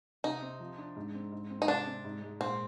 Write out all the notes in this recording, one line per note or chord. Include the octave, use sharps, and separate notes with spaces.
C3 D#4
C4
F3
D4
G#2
C4
G#2
C4
D#4
C3 D4
C4
G#2
G#3
A#2 C4